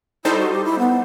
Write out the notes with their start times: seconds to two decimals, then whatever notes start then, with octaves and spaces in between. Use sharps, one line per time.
0.25 G3 D#4 E4 A4 C5
0.39 F#4
0.52 G4
0.65 E4
0.79 B3